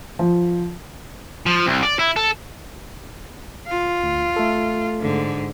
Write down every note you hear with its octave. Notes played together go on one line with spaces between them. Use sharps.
F3
F3
C2
D5
E4
A4
F4
D2
A3 A4
G#2 D3